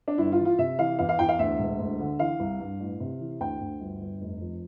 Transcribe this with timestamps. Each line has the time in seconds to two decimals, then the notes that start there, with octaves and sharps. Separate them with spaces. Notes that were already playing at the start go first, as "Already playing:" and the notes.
0.08 D4
0.18 G1 E4
0.32 F4
0.39 E3
0.45 F4
0.58 C3 E5
0.79 E3 F5
0.99 E2 F5
1.09 F5
1.19 E2 G5
1.29 F5
1.39 D2 E5
1.59 E1
1.79 D2
2.00 D3
2.19 E3 F5
2.40 C2
2.60 G2
2.80 A1
3.00 C3
3.20 E3
3.40 D2 G5
3.61 D2
3.80 G1
4.01 G1
4.21 F1
4.41 F2